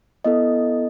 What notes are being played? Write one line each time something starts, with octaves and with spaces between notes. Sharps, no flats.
B3 E4 A4 D#5